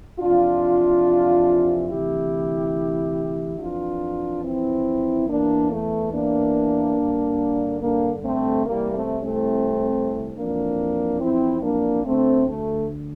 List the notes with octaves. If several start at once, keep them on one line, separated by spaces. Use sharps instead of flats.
F2 C3 E3 D4 F4
D2 C3 E3 E4 G4
F2 E3 D4 F4
C4 E4
E2 E3 A#3 D4
A3
A#3 D4
G2 D3
A#3 D4
A3 C4
C2 C3 E3 G3 A#3
A3 C4
A3 C4
F2 E3 A#3 D4
C4 E4
A#3 D4
D2 D3 A3 C4
A3